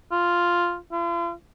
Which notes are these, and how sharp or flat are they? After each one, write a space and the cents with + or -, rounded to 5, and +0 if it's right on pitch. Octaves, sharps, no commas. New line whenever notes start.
F4 +0
F4 -45